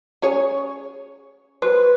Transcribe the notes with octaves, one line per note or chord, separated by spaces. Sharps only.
C#4 G#4 C#5
F#3 B4 C5